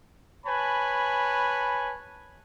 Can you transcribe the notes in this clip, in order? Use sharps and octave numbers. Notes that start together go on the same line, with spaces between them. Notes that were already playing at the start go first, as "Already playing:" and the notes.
B4 C#5 G#5 A5 B5